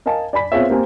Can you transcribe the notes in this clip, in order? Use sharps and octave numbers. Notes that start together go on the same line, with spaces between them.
A#4 D#5 F5 G#5 A5
D5 G#5 B5 B6
B3 C4 F4 G#4 C#5 E5
A#3 C4 G4 A#4 F5 G#5